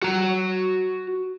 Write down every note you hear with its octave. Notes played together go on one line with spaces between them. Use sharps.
F#4 A#5